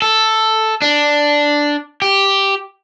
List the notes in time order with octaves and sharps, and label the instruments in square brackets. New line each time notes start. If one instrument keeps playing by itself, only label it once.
[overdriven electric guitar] A4
D4
G4